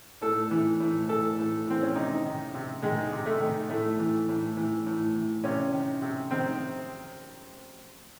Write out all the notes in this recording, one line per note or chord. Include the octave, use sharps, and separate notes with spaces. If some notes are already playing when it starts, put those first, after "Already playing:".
A2 A4
E3
A2
E3 A4
A2
E3 C4
C#4
C3 D#4
D#3
C3
D#3 G#3
C3
A3
D#3
A2 A3
E3
A2
E3
A2
E3
C3 C#4
D#3
C3
D#3 C4